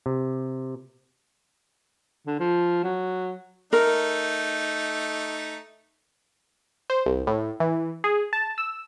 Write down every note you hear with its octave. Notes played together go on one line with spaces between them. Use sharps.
C3
D3
F3
F#3
A3 D#4 A#4
C5
C2
A2
E3
G#4
A5
E6